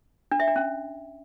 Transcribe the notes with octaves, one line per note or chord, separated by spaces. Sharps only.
D4
E5
D4
C#4